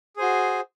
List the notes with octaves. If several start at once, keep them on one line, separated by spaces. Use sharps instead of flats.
F#4 G#4 C5